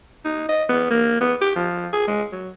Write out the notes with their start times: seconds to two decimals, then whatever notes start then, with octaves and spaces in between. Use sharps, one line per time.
0.25 D#4
0.49 D#5
0.69 B3
0.91 A#3
1.21 B3
1.41 G4
1.56 F3
1.93 G#4
2.08 G#3
2.32 F#3